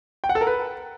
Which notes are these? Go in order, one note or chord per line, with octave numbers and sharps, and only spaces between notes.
G5
F#5
A4
A#4
B4